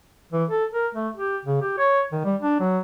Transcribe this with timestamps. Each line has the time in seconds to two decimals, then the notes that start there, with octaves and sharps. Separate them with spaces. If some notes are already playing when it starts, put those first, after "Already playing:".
0.33 E3
0.50 A4
0.73 A#4
0.95 A3
1.17 G4
1.45 C#3
1.62 G4
1.78 C#5
2.12 D#3
2.25 G3
2.42 D4
2.60 F#3